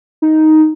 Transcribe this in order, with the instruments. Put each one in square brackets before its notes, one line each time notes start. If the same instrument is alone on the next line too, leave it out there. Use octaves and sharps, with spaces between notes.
[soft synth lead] D#4